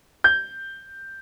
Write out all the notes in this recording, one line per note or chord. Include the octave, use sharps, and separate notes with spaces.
G6